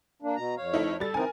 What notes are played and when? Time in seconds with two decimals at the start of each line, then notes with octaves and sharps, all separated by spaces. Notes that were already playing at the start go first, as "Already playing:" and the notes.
0.22 A#3 D4
0.36 B2 A#5
0.57 F2 C#5 F5
0.74 A3 D#4 E4
1.00 G3 A4 A6
1.14 E3 C4 D#4 A#4 G#5